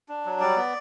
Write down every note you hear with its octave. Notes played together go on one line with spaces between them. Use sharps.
D4
F#3
G3 D5
B3